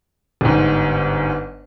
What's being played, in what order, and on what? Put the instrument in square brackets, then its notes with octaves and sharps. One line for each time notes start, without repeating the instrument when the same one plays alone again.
[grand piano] G1 G#2